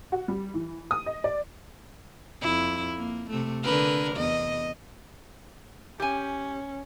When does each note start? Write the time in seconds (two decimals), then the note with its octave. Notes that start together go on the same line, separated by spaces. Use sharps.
0.12 F#4
0.28 G3
0.54 E3
0.91 D#6
1.06 D#5
1.24 D5
2.42 F2 E4
2.97 A#3
3.30 C3 A3
3.63 D3 A#4 B4
4.16 E2 D#5
6.00 C#4 G4 G#5